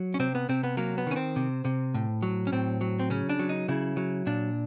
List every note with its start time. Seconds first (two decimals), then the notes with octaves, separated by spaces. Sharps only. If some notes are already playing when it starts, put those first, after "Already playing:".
Already playing: F#3
0.14 C#4
0.20 C3 C4
0.35 B3
0.49 C3 C4
0.63 B3
0.77 F#3 A#3
0.98 B3
1.07 D#3 C#4
1.16 C4
1.36 C3
1.65 C3
1.94 A2
2.22 F#3
2.47 C#4
2.52 A2 C4
2.81 F#3
2.99 C4
3.10 C#3 C#4
3.29 D4
3.39 F#3
3.49 D#4
3.68 C#3 E4
3.97 F#3
4.26 A#2 D4